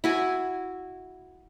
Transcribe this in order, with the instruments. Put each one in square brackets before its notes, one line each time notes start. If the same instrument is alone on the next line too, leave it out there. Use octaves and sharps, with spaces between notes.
[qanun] E4 F#4 G#5